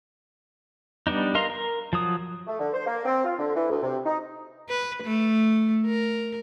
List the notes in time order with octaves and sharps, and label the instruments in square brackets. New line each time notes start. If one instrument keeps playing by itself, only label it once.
[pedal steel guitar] G3 B3 D4 D#4
A#4 D#5 F5 A#5 C6
A#4
F3 F#3 D#6
[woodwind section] A3
D3
C5
A#3
C4
F4
D3
E3
D2
C3
D#4
[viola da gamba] B4
A3
A#4